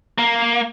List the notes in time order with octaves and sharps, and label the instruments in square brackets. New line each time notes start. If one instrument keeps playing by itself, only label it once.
[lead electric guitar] A#3